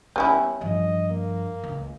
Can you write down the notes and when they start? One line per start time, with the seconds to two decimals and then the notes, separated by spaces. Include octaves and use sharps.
0.16 G3 B3 C#4 E4
0.61 G2 F3 D#5
1.10 A#3
1.64 C#2